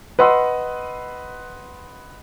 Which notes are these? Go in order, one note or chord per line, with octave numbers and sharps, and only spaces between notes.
B4 D#5 F#5 C6 E6